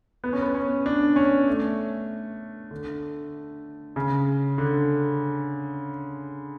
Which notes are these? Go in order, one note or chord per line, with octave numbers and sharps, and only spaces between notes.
B3
C#4
B3
C#4
D4
C#4
A3
D3
C#3
D3